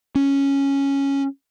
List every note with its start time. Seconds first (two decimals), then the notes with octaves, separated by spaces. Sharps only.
0.15 C#4